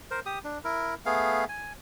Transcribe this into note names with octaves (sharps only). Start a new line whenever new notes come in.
A#4 C5
G4 D#6
D4
E4 A#4
A3 B3 G#4 F5
G#5